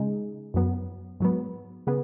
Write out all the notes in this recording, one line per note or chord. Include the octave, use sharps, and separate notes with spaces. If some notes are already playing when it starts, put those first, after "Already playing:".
Already playing: C#3 G#3 D#4 G#4
F#2 F#3 B3
G#2 F#3 B3
C#3 B3 G#4